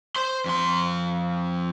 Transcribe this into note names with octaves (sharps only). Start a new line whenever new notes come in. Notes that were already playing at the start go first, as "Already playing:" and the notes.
C5 C6
F2 C6